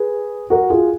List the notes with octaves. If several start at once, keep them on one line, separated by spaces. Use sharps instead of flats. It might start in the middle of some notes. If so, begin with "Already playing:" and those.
Already playing: G#4 B4
F#4 A#4
F4 G#4